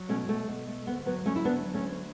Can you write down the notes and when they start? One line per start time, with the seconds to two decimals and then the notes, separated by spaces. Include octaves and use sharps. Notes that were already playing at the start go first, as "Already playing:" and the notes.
Already playing: F#3
0.09 B2 A3 C#4
0.28 B2 A3
0.48 B2
0.67 A3
0.86 D2 B3
1.06 F#3 B3
1.26 D2 A3 C#4
1.36 E4
1.45 D2 B3 D4
1.65 F#3
1.74 A3 C#4
1.84 D2